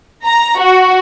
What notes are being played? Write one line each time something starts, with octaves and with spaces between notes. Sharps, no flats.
A#5
F#4